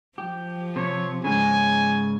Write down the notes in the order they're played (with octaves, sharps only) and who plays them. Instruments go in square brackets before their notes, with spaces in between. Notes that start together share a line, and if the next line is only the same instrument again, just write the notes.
[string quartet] F3 [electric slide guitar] G4
[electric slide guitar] C3 [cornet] C#5
[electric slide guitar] G#2 C#3 [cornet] G#5